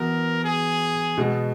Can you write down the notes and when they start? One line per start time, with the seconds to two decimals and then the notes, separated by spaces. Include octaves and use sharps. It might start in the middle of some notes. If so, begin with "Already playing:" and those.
Already playing: E3 B3 F#4 A#4
0.44 G#4
1.17 B2 G#3 B3 F#4